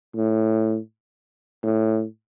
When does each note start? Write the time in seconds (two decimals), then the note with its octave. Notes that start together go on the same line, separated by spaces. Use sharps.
0.15 A2
1.63 A2